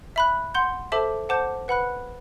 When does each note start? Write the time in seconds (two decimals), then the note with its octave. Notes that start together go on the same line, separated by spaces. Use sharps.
0.16 E5 B5 F#6
0.54 F#5 C6 G6
0.92 A4 C5 E5 A5 D6
1.29 C5 F#5 A5 D6 G6
1.68 B4 F#5 B5 F#6